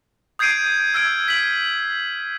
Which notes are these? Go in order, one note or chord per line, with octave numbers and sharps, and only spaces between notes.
D#6 G6 G#6 C7 D7 D#7
E6 F6 G#6 D7
B6 F#7